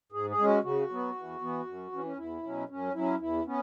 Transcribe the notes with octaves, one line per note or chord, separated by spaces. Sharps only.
G#2 G#4
G#4
G#3 C#4
F#4
C#3 F#4
F#3 B3
E2
E3 B3
F#2
E3 C#4
C#4
E2 E4
B2 F#3 C#4
F#2 C#4
F#3 C#4 E4
E2 E4
B3 C#4